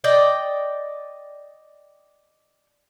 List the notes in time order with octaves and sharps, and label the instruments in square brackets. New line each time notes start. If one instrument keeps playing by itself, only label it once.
[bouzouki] D5 D#5 G5